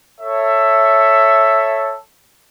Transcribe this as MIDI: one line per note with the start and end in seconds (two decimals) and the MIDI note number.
0.20 1.96 69
0.20 1.96 73
0.20 1.96 76